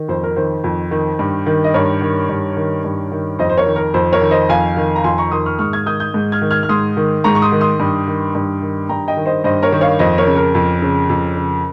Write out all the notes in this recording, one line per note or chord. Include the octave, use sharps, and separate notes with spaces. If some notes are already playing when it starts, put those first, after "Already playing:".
Already playing: D#3
F2 C5
A#4
D#3 C5
F2
D#3
G2
D#3
D#5
G2 A#4 C#5
D#3
G2
D#3
G2
D#3
F2 C5 D#5
C5
A#4 C#5
D#3
A#4
F2 C5
A#4 C#5
D#3
C5 D#5
F2 F5 G#5
D#3
A#5
F2 G#5 C6
A#5 C#6
D#3 C6 D#6
C#6 F6
G#2 C#6 F6
F6 G#6
D#3 D#6 G6
D#6 G6
G#2
F6 G#6
D#3
F6 G#6
F6
G#2 C6 D#6
D#3
G#2 A#5 C#6
C#6
C6 D#6
D#3
C6 D#6
G2
D#3
G2
D#3
G2 G5 A#5
D#5 G5
D#3
C5 D#5
G2 C5 D#5
A#4 C#5
D#3
C#5 F5
F2 C5 D#5
A#4 C#5
C#3
A#4
F2
C#3
F2
C#3